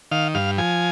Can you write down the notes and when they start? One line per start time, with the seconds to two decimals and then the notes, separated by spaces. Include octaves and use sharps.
0.11 D#3 F5
0.35 G2 F5
0.58 F3 G#5